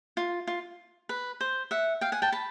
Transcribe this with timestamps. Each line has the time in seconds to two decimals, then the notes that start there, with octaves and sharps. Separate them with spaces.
0.17 F4
0.47 F4
1.09 B4
1.41 C5
1.71 E5 F#5
2.01 F5 G5
2.12 F#5 G#5
2.22 G5 A5
2.32 A5 B5